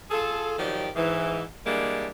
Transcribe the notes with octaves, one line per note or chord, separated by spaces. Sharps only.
F4 G#4 A4
D#3 F3 F#3 G4 D5
G#2 E3
E3 G3 G#3 A#3 D4